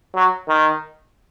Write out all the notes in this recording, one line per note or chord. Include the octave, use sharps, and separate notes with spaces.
F#3
D#3